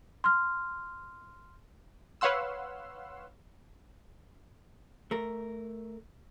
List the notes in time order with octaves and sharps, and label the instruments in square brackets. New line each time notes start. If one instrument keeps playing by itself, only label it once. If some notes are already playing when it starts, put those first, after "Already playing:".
[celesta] C6 F6
[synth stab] B4 C#5 F5 F#5 C6 E6
[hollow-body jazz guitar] A3 A#4